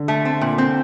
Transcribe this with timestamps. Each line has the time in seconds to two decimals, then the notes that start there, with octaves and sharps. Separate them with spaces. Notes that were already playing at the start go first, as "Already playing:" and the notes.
Already playing: D3
0.08 A3
0.25 C4
0.41 A#2
0.58 C4